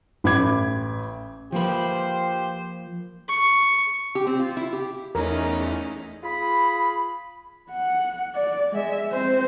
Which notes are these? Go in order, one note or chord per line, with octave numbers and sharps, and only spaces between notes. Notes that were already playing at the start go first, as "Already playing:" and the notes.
A1 B5 D6 G#6
F3 A#3 F4 G4 B4 C5
C#6
G4
C4
F4
E4
G4
E2 A3 C#4 D#4 A#4
F4 G#4 B5
F#5
D5
G#3 E5
C4 C5